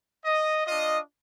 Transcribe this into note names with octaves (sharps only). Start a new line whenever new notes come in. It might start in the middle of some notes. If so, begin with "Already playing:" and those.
D#5
D4 F4 D#5